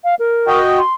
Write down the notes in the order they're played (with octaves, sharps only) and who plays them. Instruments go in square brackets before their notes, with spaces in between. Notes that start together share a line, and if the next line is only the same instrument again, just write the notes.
[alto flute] F5
A#4
[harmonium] F#4 D#5 G5
[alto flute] C6